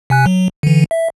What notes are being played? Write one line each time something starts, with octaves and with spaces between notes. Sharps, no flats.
C3 G#5 F#6
F#3
D3 E3
E5